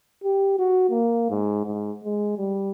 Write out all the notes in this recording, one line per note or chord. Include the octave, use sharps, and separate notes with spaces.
G4
F#4
A#3
G#2
G#2
G#3
G3